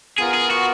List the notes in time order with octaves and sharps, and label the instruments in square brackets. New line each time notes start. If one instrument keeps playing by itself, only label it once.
[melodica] B3 F4 A#4 [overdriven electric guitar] G#4
[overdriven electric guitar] G#4
F#4